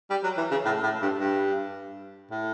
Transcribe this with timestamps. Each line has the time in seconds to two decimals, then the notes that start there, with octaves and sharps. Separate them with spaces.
0.10 G3
0.24 F#3
0.38 E3
0.51 C#3
0.65 A2
0.83 A2
1.02 G2
1.20 G2
2.31 A2